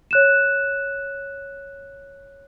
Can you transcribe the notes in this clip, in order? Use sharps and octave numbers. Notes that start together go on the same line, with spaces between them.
C#5 F#6 E7